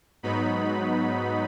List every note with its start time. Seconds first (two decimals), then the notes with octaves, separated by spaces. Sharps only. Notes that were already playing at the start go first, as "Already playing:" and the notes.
0.23 G#2 F#3 B3 D#4 B5